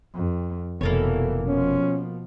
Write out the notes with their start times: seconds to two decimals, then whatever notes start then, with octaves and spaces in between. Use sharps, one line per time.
0.15 F2
0.81 F1 B2 E3 A#3 A4 C#5
1.45 B2 F3 C#4